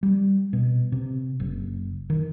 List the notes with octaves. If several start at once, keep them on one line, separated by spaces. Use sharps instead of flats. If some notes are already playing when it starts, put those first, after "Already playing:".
G3
B2
C3
F#1
D#3